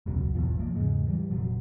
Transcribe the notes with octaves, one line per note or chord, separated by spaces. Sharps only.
E1 C#2 F#2 B2
G#1 E2 B2 F3
F3 G#3 A#3
E2 G#2 C#3 G#3
E3 G3
F1 A#2 F3 F#3